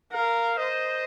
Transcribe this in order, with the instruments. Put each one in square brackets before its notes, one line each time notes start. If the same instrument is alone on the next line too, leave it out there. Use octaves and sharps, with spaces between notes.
[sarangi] A#4 [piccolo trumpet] F5
[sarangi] C5 [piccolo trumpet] D#5